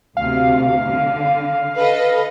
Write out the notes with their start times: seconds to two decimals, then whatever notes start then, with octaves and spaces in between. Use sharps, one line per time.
0.17 D2 C3 F5
0.89 D3
1.78 A4 B4 D#5